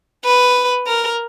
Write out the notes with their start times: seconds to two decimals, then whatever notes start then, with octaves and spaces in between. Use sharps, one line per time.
0.25 B4
0.87 A#4